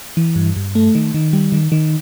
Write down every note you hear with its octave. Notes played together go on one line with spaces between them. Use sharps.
E3
G2
G2
A3
D#3
D#3
G3
D#3
D#3